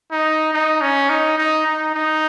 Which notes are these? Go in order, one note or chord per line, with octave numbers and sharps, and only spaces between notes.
D#4
D#4
C#4
D#4
D#4
D#4
D#4